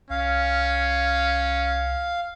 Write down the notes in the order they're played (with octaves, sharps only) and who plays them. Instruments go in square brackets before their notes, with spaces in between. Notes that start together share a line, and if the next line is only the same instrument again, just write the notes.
[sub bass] C2 [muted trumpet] C#4 [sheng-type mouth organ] F5